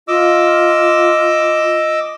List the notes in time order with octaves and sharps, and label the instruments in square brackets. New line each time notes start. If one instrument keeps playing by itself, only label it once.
[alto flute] F4 [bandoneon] D#5 D6 E6